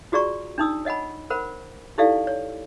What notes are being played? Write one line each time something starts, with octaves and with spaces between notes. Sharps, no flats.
F4 F#4 G#4 D5 A#5 C#6
D4 D#4 D#6 E6
C#5 D#5 F#5 G#5 B5
A#4 C5 F#5 B5
D#4 E4 G4 A4 D5 F5
C#5